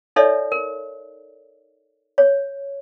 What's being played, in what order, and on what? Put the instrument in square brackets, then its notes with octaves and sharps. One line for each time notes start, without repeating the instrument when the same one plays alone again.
[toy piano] D#4 A4 C#5 D5 E5
A#4
C#5